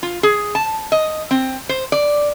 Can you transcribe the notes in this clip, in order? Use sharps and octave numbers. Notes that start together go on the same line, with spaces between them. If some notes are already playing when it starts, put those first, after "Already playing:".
F4
G#4
A5
D#5
C4
C5
D5